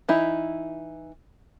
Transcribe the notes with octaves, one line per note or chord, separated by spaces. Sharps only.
E3 D#4 E4